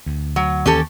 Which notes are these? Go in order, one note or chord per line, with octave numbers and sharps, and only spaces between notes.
D2
F#3
D#2 E3 C#4 G4 A4